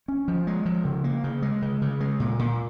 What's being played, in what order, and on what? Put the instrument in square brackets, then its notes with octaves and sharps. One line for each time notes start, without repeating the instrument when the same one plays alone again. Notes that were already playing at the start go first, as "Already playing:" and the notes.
[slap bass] C#4
F3
G#3
F3
C#3
A#3
C#3
G#3
C#3
C#3
G#3
A#2
A#2